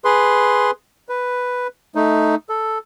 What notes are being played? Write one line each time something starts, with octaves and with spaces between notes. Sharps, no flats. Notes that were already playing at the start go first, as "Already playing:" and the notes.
G#4 B4 C6
B4
A3 D#4
A4